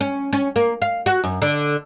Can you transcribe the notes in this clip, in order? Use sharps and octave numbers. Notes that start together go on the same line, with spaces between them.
C#4
C#4
A#3
F5
F#4
F#2
D3